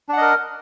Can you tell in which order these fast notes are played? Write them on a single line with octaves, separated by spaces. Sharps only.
D4 F#5 D#5 A#4